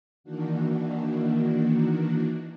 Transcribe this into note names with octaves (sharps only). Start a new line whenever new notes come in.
D#3 E3 A#3 D4 F#4